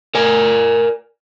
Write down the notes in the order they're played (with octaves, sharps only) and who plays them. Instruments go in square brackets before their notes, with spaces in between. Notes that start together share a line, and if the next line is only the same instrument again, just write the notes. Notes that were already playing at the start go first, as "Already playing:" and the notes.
[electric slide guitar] A#4 D5 G#5